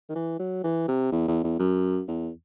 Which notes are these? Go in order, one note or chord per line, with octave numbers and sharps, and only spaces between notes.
D#3
E3
F#3
E3
C3
E2
E2
E2
F#2
E2